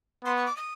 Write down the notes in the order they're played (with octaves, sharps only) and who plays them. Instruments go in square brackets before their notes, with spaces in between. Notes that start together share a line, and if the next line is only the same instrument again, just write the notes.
[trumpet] B3 [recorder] C6
[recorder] C#6
D6
D#6